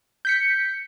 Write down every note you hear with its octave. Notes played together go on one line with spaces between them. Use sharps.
G6 B6 C#7